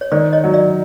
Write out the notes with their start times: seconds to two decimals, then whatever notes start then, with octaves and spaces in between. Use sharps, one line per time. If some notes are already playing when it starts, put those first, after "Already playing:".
0.01 C#5
0.12 D#3 C5 D5
0.33 C#5 D#5
0.44 F#3
0.54 D5 E5